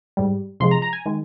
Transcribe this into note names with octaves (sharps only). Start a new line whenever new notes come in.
G#2 G3
C3 F3 G#3 C6
A#5
A#5
G#5
D#3 G#3